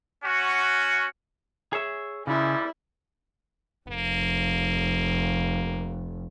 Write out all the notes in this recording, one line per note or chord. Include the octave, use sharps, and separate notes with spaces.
C#4 F#4
G#4 C#5 E5
G#1 C#3 G3 G#3 E4
F1 A#3